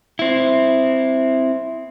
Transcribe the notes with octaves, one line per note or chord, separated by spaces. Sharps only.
C4 E4